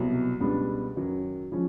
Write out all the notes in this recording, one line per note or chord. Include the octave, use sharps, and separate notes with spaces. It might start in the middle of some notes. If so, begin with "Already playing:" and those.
Already playing: C2 B2 F#3
C#2 B2 G3 B3 D4
F#2 D#3 F#3
C#3 F3 G#3 C#4